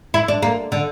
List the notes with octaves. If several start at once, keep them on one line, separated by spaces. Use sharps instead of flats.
E4
D4
A#3
D3